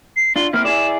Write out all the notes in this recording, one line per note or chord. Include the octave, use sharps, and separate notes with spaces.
C7
D4 F4 G7
A#3 C4 E4 F6
E4 G#4 D5 E7